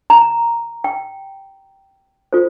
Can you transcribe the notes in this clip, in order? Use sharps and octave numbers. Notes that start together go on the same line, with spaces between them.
A#5
G5
F4 A4 C5